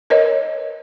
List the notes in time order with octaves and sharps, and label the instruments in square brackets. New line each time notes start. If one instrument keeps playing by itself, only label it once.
[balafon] A#4 B4 C#5 D#5